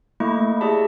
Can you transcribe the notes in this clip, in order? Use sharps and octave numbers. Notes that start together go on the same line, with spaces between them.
A3 A#3 E4 D#5 C#6
G4 G#4 D5 E5 A5